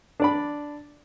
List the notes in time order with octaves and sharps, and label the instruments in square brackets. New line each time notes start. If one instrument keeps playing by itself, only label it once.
[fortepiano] D4 D5 B5